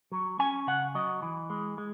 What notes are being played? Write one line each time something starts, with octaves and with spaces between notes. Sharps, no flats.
F#3
C#4 G#5
C#3 F#5
F#3 D#5
E3
G#3
G#3